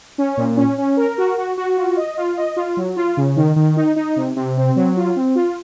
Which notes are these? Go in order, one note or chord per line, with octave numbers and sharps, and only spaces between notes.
C#4
A#2
C#4
C#4
A#4
F#4
F#4
F#4
F4
D#5
F4
D#5
F4
F#3
F4
C#3
D#3
D#3
D#4
D#4
C3
C3
C4
F#3
F4
C4
F4